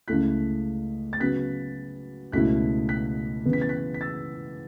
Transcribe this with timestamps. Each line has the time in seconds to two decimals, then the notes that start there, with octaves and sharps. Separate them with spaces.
0.08 C#2 C#3 A3 E4 F#6 B6
1.13 A6
1.20 C#3 F#3 B3 F#6 B6
2.32 C#2 B2 A3 C#4 E4 F#6 B6
2.89 F#6 B6
3.46 C#3 E3 B3
3.53 B6
3.61 A6
3.69 F#6 B6
3.94 B6
4.01 E6 A6